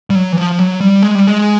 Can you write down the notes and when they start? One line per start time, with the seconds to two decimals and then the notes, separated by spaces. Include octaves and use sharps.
0.10 G3
0.15 F#3
0.33 E3
0.37 F3
0.59 F#3
0.81 G3
1.03 G#3
1.15 G3
1.27 G#3